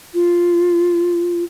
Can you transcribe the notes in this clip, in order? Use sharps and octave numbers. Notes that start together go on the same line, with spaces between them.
F4